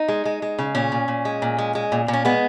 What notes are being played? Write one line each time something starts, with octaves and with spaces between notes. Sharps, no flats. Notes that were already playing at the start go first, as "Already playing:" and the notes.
Already playing: D#4
G#3
G#3
G#3
C#3
A#2 C#4
A#2
A#2
G#3
A#2
G#3
G#3
A#2
A#2
C#4
G#3 B3